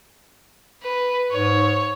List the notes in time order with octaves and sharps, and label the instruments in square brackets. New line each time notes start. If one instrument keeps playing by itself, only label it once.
[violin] B4
[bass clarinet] G#2 [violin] C#5